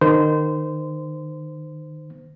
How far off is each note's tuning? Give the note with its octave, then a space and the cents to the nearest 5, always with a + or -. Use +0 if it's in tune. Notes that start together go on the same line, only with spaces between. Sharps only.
D#3 -25 C5 -25